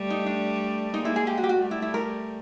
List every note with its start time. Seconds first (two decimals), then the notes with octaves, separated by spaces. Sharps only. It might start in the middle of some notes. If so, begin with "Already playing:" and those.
Already playing: G3 A3
0.10 D#4
0.26 D4
0.93 G#3 A#3 D#4
1.05 E4
1.16 G#4
1.27 G4
1.38 F#4
1.44 G4
1.49 F#4
1.60 G3 A3
1.71 E4
1.82 E4
1.94 A#4